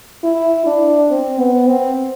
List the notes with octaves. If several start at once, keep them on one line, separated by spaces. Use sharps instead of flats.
E4
D4
C4
B3
C4